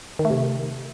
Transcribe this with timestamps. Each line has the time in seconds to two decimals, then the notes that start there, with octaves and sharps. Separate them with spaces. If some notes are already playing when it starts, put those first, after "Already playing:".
0.19 D#3
0.25 A3
0.30 C3